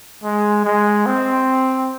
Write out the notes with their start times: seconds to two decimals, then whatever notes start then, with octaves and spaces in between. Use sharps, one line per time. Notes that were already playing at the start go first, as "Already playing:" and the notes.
0.24 G#3
0.65 G#3
1.06 C4